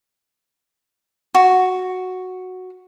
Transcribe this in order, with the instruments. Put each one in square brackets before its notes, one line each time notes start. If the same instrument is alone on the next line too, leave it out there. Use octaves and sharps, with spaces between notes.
[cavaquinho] F#4